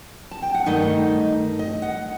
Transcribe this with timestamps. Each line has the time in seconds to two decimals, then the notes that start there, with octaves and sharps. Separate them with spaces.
0.31 A5
0.42 G5
0.54 F#5
0.66 G2 D#3 A3 D#4 D#5
1.59 D#5
1.82 F#5